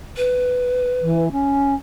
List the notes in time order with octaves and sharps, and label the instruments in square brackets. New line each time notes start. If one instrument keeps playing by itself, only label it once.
[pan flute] B4
[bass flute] E3
C#4